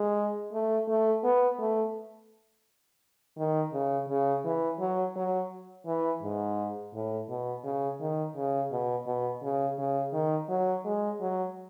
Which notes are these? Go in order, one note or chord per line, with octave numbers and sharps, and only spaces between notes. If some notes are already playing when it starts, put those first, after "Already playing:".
Already playing: G#3
A3
A3
B3
A3
D#3
C#3
C#3
E3
F#3
F#3
E3
G#2
A2
B2
C#3
D#3
C#3
B2
B2
C#3
C#3
D#3
F#3
G#3
F#3